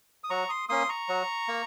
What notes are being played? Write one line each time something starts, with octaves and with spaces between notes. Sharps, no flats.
D#6
F#3 A#5 C#6
C6 D#6
A#3 C#4 C6 D#6
A#5 C#6
F#3
A#3